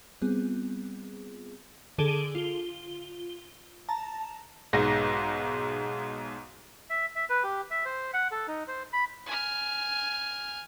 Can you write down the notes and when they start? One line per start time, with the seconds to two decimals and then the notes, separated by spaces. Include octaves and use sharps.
0.22 G3 B3 C4 F4 G#4
1.98 D3 G#4 A4 D7 D#7 G7
2.35 F4 G7
3.89 A5 A#5
4.73 B1 G#2 A#6
6.90 E5
7.16 E5
7.30 B4
7.44 G4
7.71 E5
7.85 C5
8.14 F#5
8.32 A4
8.48 D#4
8.68 C5
8.93 B5
9.27 G#5 F6